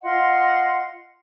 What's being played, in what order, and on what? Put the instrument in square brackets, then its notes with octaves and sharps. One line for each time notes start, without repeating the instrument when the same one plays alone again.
[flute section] F4 D#5 F#5 C6